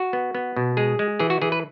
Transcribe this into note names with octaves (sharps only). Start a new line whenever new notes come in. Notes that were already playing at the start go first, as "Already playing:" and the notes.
Already playing: F#4
B3
B3
B2
G#3 G#4
G#3
E3 G#4
F#4
E3 G#4
B4